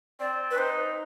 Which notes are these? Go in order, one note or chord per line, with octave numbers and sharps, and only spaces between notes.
C4 D5
B4
D#4 C5